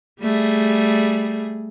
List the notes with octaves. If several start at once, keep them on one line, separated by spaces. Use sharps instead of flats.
G3 A3 G#4